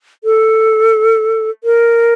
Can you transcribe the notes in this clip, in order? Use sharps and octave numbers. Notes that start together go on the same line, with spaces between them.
A4
A#4